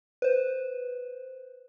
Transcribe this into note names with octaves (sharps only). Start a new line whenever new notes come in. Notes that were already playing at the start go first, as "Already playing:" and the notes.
B4 C5